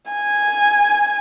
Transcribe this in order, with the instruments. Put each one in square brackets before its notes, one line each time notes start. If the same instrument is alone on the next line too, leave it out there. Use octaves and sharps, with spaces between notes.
[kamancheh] G#5